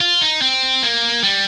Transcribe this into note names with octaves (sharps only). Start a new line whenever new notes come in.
F4
D#4
C4
A#3
G3